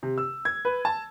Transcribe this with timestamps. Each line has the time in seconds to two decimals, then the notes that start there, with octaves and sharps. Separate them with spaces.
0.03 C3
0.18 E6
0.45 G#6
0.65 B4
0.85 A5